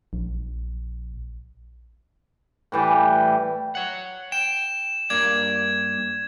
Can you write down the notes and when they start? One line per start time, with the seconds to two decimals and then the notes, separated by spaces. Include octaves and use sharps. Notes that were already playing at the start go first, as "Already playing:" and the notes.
0.13 A#1
2.72 A2 E3 G3
3.75 C#5 F#5
4.32 G5 E7
5.10 G2 A#3 D5 G#6